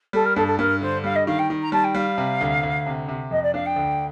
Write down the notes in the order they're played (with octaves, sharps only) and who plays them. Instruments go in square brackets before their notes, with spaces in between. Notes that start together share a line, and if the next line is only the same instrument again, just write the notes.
[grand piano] G3 [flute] A4
[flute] A#4
[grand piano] G2 [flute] A4
[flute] A4
[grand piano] G2 [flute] A#4
[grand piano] D3 [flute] C5
[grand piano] G3 [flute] F5
[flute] D#5
[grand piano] D#3 [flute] F5
[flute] G5
[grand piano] D#3
[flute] A#5
[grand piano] G3 [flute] A5
[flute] G5
[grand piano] G3 [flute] F5
[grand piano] C3
D2
D2
C3
C3
[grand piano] F2 [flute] D#5
[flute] D5
[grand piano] D4 [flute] F5
[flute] G5
[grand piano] D2